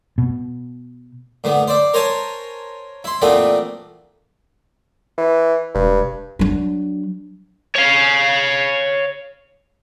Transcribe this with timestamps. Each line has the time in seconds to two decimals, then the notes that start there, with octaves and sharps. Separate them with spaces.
0.18 B2
1.44 A2 D3 B3
1.68 C5 D5 E5
1.94 A#4 C5 C#5 G#5 A5
3.04 E4 C6
3.22 A#2 E3 A3 B3 C4 D4
5.18 E3
5.75 E1 G2
6.39 F#3 D4
7.76 C#5 F5